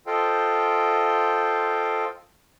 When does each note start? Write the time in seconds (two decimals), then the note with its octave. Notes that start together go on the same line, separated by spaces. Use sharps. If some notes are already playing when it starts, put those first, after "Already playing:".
0.07 F4 A4 C5 D#5 F5 G5